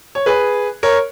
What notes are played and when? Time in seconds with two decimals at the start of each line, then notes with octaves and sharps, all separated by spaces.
0.15 C#5
0.26 G#4 B4
0.83 A#4 C#5